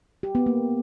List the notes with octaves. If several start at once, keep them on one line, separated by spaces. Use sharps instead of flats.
G4
B3
A#3